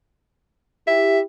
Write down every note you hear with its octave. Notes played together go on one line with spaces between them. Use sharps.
E4 G4 E5